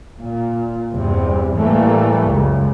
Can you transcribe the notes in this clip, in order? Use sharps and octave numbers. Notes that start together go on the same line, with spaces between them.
A#2
E2 G2 C3 G3
A2 E3 G3 A3 A#3
C#2 F#2